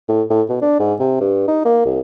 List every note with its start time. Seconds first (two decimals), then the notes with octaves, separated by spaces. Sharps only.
0.08 A2
0.30 A2
0.49 B2
0.62 D4
0.80 G#2
0.99 C3
1.21 G2
1.48 D#4
1.65 A#3
1.85 C2